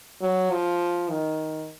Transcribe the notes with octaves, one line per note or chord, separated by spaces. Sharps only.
F#3
F3
D#3